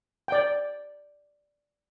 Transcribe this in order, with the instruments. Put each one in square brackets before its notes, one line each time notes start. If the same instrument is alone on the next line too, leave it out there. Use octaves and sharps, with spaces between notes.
[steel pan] D5 G5